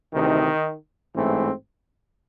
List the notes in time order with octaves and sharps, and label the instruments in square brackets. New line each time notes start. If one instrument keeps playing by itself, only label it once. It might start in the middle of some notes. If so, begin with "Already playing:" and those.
[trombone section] D2 C3 D#3 E3 D#4
A1 G#2 E3 A3 C4